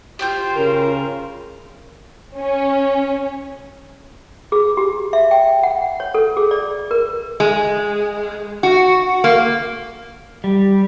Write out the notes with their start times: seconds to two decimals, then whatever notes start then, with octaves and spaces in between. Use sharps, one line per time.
0.19 F4 G4 C5 G5 G6
0.56 C#3 A#4
2.35 C#4
4.52 G#4
4.77 G4
5.13 E5
5.31 G5
5.63 F#5
6.00 C#5
6.14 A4
6.37 G#4
6.51 D5
6.91 A#4
7.40 G#3
8.63 F#4
9.24 A#3
10.44 G3